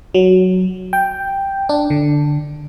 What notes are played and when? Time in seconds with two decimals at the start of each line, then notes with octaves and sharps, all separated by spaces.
0.14 F#3
0.93 G5
1.69 D4
1.90 D3